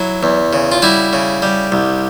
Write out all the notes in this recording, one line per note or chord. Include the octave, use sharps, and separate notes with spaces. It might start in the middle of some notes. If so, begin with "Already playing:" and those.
Already playing: F#3 E4
E2
C#3
F4
G3 E4 F#4
C#3
G3
C2